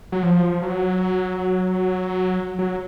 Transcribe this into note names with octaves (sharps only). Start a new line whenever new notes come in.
F#3
F3
F#3
F#3